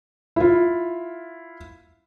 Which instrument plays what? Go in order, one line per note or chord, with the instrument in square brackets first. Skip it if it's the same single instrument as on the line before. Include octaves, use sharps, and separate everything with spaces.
[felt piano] E4 F4